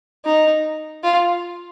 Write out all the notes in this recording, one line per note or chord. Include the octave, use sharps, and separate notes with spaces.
D#4
F4